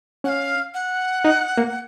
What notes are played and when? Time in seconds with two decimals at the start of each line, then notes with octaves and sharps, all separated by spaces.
0.24 C#4 F#5
0.29 F5
0.74 F#5
1.25 D#4
1.57 A#3